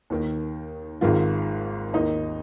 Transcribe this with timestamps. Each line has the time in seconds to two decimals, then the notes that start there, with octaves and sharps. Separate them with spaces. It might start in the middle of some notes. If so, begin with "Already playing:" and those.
0.10 D#2 D#3
1.01 G#1 G#2 D#3 F4
1.93 D#2 D#3 D#4